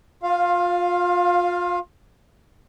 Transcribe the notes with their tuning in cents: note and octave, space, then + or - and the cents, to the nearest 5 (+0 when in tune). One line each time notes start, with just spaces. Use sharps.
F4 +25 F5 +0